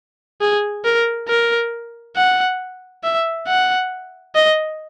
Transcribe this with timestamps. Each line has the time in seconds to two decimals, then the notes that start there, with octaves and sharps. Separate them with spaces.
0.41 G#4
0.85 A#4
1.29 A#4
2.16 F#5
3.04 E5
3.48 F#5
4.35 D#5